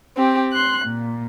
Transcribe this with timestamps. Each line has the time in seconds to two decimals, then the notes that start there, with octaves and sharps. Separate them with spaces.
0.16 C4 G4
0.52 C6 F#6
0.86 A#2